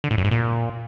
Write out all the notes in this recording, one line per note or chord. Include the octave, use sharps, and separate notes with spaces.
D3
A2
F#2
G#2
A#2